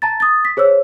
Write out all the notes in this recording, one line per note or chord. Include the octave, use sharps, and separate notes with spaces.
A5 A#5 A6
D#6 A6
B6
G#4 C5 C#5 E6